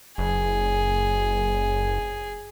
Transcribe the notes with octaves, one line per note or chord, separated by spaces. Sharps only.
F#1 G#4